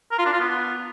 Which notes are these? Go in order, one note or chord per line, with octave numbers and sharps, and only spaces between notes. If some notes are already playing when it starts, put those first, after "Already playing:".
A#4
F4
D4
F4
B3